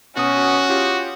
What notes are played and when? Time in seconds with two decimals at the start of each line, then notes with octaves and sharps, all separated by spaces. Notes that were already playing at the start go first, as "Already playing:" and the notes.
0.17 B2 C#4 F#4 D#6
0.69 F4 G4